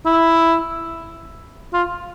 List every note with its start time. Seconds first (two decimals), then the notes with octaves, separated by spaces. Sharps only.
0.06 E4
1.73 F4